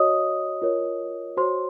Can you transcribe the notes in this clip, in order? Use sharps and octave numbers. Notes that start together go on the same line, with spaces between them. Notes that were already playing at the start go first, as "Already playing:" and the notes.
Already playing: F#4 C#5 D#5 D#6
F4 A#4 C#5
F#4 C5 C#5 C6